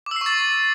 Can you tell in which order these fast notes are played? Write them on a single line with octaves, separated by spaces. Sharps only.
D6 E6 C7 C#6 A6